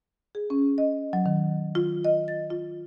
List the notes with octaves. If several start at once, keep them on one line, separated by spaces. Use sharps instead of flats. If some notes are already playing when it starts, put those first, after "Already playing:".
G#4
C#4
D#5
F#3
D#3
F4
D#5
A6
F4